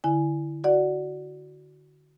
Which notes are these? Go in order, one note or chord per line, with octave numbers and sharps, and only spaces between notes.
D3 E4 G#5
F#4 D5 F#5